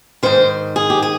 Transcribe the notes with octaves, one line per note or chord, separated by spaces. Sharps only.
G#2 D#3 C5
G#4
G4
G#4